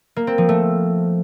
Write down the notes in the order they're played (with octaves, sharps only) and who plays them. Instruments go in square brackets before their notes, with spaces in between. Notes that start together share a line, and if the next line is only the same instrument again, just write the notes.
[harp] A#3
C4
F3
A3